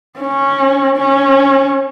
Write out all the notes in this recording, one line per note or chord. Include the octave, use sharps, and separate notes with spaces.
C#4
C#4